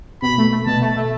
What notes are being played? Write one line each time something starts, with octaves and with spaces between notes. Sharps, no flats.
B2 B5
A3
A3
B2 A5
A3
A3